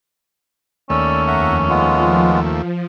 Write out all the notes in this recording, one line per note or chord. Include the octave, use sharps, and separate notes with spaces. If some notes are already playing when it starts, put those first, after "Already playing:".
D#2 A3 C#4 D5 E6
F2 E5 F#5 A#5
F3 G#3 B3 F4